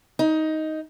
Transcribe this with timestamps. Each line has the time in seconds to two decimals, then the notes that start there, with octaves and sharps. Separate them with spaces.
0.19 D#4